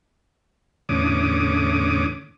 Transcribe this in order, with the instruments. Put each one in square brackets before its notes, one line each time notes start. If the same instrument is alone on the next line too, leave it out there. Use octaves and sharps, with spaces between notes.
[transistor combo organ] E2 A2 D3 C#4 D6 D#6